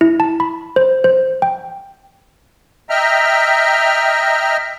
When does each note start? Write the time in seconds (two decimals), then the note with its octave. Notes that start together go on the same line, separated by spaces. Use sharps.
0.01 E4
0.20 A5
0.40 B5
0.76 C5
1.04 C5
1.42 G5
2.90 D#5 E5 G5 A#5 F6